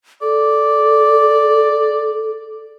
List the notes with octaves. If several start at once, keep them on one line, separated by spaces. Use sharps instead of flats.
A4 D5